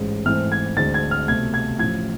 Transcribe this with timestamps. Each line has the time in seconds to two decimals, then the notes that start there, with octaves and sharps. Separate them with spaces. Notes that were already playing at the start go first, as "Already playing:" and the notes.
Already playing: A1 G#2 G#3
0.25 G#2 E3 A3 C4 F6
0.52 G#6
0.77 D2 D3 G#3 C4 A6
0.94 G#6
1.11 F6
1.28 C2 B2 A3 C4 G#6
1.54 G#6
1.79 A1 A2 F3 G#6